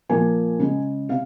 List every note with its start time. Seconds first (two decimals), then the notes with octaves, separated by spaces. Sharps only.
0.09 A#2 F3 A#3 G#5
0.59 C#3 G#3
1.09 C3 F5